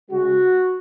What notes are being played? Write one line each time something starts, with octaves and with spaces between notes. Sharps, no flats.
C#3 G#3 F#4